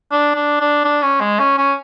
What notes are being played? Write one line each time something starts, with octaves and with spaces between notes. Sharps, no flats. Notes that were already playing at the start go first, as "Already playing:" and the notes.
D4
D4
D4
D4
C#4
G#3
C#4
C#4